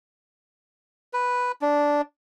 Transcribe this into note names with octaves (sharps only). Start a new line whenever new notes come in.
B4
D4